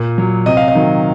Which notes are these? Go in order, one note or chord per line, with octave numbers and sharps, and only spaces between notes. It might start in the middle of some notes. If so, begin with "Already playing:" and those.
Already playing: A#2
F#3
C3 D#5
F5
D#5
D#3 F#3